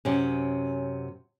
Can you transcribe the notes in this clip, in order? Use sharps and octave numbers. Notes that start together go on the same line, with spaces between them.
F#2 C3 C#4